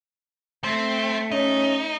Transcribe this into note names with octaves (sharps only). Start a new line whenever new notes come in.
A3 C4
C#4 D#4